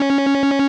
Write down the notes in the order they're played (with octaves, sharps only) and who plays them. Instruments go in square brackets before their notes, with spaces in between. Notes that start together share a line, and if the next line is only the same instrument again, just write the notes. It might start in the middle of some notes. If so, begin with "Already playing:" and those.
Already playing: [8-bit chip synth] C#4